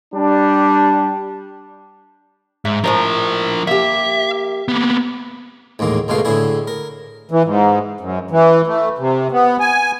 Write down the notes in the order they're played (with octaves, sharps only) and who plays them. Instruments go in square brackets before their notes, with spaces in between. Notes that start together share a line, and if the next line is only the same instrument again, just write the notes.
[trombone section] G3 D4
[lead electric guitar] G#2 [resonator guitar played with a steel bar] E5
[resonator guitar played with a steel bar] A2 C5 A#5 [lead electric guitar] F3 A#4
[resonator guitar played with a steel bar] A#3 G4 [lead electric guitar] E5
[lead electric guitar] A#3 B3
[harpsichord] A1 D#2 G#2 A#3
C#2 G#2 B2 A3 F5
A2 D3 E4 G#4
A#4
[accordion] E3
G#2
F#2
E3
A3
C3
B3
G#5